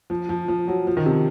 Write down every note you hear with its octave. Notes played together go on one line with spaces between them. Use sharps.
F3
F3
F3
F#3
F3
D#3
C3